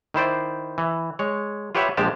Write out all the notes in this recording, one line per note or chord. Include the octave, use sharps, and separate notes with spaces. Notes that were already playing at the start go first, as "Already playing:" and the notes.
D#3 E4 C5 D5
E3
G#3 C#5
F4 G4 B4 C#5 E5 F#5
A#1 F3 G#3 G4 A5